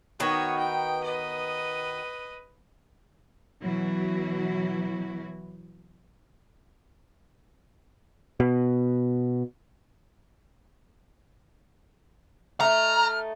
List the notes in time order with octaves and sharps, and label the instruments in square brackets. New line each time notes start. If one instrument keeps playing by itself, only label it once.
[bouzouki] D#3 B3 F#4 [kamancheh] D#4 C#5
[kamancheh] G5
B4 D#5
[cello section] B2 E3 F#3 E4 F#4
[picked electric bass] B2
[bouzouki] A3 D#4 [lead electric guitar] A#5 [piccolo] F6